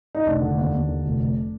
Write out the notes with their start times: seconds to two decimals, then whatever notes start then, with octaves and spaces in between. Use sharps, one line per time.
0.15 D#4
0.26 F1 D4
0.41 D3
0.57 D#2
0.72 D#2
0.88 D3
1.05 F1
1.20 F1